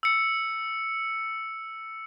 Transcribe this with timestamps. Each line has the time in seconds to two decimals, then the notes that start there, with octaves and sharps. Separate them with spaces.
0.03 E6 C#7